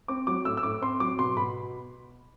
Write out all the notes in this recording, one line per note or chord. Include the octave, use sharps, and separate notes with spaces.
C4 D6
F#3 D6
A2 E6
E6
A2 D6
C4 C6
F#3 D6
B2 C6
B2 B5